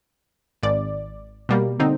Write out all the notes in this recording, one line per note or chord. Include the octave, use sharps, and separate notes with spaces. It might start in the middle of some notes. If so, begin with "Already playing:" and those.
G#1 D5
B2 G3 A#3
D3 C4 D#4